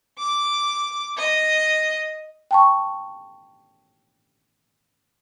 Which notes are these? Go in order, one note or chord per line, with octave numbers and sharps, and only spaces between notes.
D6
D#5
G5 A5 C#6